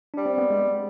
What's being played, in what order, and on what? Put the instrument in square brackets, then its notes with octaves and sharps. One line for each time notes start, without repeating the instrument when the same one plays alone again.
[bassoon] G3 [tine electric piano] D4
[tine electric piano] C4
B3
G#3